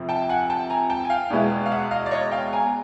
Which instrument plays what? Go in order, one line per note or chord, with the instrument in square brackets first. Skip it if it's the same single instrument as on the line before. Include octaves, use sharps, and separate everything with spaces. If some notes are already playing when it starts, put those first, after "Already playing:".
Already playing: [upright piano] F2 C3 F3
[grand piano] G5 A5
F#5 G#5
G5 A5
G#5 A#5
G5 A5
G#5
F5 G5
[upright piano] E2 B2 G#3 B3 E4
[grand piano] F5
E5 F#5
D#5 F5
D5
C#5 D#5
F5 G5
G#5 A#5